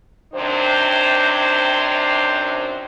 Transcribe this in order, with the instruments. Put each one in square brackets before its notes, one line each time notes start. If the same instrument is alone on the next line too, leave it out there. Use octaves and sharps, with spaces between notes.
[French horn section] F#2 C3 D#3 D4 C5